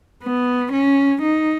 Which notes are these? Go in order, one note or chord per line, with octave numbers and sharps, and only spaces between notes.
B3
C#4
D#4